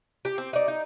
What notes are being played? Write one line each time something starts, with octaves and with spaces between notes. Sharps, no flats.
G4
C4
D#4 D5
D#4